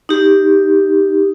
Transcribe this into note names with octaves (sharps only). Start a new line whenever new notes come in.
D#4 G4